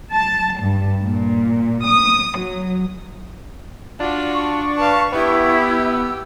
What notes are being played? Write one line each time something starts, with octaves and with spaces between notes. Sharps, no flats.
A5
G2
A#2
D#6
F#3
D4 F4 F#4
C#6
B4 F5 A5
B3 E4 G4
E6